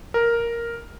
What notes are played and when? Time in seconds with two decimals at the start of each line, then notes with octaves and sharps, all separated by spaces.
0.14 A#4